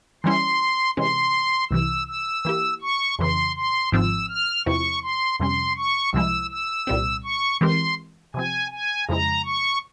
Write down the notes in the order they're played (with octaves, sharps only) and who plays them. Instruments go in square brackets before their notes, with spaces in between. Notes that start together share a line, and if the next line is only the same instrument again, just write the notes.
[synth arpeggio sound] E3 G3 C#4 E4 [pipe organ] C6
[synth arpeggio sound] C3 E3 G#3 C#4 [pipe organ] C6
[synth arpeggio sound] C2 C3 E3 [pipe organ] E6
[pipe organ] E6
[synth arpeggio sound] E3 A#3 E4 G4
[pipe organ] C#6
[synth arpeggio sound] F2 C#3 E3 [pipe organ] C6
[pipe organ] C6
[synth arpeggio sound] G#1 G#2 F3 C4 F4 [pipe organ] E6
[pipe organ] F6
[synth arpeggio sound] E2 C3 F3 C4 E4 [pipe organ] C#6
[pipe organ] C6
[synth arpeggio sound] F2 C3 G3 C#4 [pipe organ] C6
[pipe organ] C#6
[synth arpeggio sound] C2 C3 F3 G#3 E4 [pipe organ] E6
[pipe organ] E6
[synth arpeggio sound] C2 A#2 G3 C4
[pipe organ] C#6
[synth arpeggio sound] E3 G#3 C4 G4 A#4 [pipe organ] C6
[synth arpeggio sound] C3 F3 C4 [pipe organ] G#5
[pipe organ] G#5
[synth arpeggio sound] F2 C#3 F3 G#3 E4 [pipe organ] A#5
[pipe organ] C#6